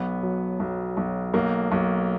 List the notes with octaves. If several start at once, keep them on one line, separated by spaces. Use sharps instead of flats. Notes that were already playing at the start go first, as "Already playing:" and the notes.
Already playing: B1 B3
F#3
B1
B1
B1 A#3
B1